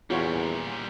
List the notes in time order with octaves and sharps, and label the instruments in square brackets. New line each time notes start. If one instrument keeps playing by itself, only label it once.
[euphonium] E2 [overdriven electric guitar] A#2 G3 [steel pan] F4 F#4 C#5